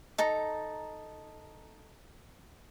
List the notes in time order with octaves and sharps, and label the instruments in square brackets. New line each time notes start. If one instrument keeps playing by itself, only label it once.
[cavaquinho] D#4 A4 A#5